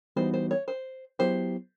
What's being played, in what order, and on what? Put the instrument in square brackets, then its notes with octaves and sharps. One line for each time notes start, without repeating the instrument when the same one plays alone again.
[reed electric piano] E3 G3 B3 D#4 F#4 [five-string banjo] C5
[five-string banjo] C5
C#5
C5
[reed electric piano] F#3 B3 E4 G4 [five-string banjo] C5